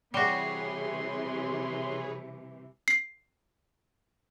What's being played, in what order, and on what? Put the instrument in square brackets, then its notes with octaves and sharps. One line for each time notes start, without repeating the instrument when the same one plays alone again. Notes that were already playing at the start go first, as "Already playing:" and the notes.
[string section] C3 E3 [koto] G3 F#4 [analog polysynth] G#4 B4 C#5 [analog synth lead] C6
[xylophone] C7